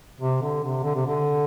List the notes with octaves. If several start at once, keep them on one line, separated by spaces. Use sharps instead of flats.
C3
D3
C3
D3
C3
D3